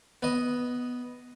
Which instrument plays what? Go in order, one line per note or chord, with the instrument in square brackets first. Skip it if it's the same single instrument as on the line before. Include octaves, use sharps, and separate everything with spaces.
[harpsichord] B3 D#5